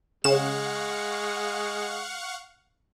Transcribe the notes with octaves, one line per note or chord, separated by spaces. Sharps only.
C#3 G#3 F5 F#5 C#6 E7